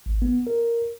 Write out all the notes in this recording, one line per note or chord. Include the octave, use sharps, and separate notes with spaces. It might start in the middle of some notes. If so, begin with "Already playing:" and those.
G#1
B3
A#4